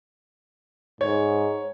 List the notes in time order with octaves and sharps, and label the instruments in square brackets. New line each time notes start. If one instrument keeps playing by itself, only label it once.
[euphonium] G#2 [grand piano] C#5